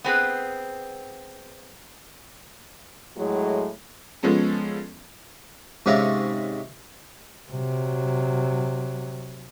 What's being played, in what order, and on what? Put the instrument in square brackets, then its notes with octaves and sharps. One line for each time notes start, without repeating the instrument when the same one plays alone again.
[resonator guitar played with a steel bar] B3 C4 G#4 B4
[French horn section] A2 F#3 G#3
[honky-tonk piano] F3 G#3 B3 C#4 A4
[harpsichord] G#2 C3 C#4 E5 F5 A#5
[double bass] C3 F#3